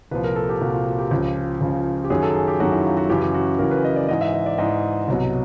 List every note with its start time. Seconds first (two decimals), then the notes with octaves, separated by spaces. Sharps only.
0.11 C2 A#2 F3 B4
0.24 A#4
0.36 A4
0.49 G4
0.61 C2 A#2 F3 F#4
0.73 F4
0.86 F#4
0.98 G4
1.11 C#2 C#3 F3
1.61 C#2 C#3 F3
2.04 G4
2.10 F#2 D#3 F#3 G#4
2.23 A4
2.35 G#4
2.48 G4
2.60 F#2 D#3 F#3 F#4
2.72 E4
2.85 F4
2.97 F#4
3.09 F#2 C#3 E3 G4
3.22 G4
3.34 F#4
3.59 F#2 C#3 E3 A#4
3.71 B4
3.84 D#5
3.96 D5
4.09 G#2 E3 D#5
4.21 E5
4.34 D#5
4.46 D5
4.58 G#2 E3 D#5
5.08 C2 B2 F#3